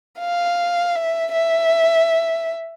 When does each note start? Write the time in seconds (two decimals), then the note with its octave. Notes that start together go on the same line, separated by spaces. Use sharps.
0.19 F5
0.95 E5
1.32 E5